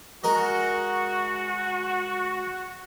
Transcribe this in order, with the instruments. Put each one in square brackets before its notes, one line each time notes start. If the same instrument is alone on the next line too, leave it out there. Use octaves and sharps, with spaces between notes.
[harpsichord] G#3 A#4 D#5 [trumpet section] F#4